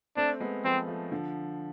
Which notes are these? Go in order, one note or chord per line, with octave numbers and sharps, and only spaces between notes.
A3 C4 D4
G#3 B3
F3 A3 C4
F3 A3
D3 F3